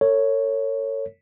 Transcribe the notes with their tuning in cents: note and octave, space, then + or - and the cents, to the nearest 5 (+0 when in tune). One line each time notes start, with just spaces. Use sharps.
A4 +45 C#5 +0